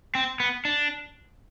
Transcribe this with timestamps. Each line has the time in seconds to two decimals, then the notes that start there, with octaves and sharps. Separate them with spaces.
0.15 C4
0.40 B3
0.65 D4